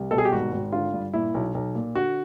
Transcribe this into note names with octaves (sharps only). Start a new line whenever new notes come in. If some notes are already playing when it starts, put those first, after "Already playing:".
Already playing: C2
B2 A4
G#4
G4
G#1 F#4
G#1
D3 F4
G2
A#2 E4
B1
B1
A#2
D3 F#4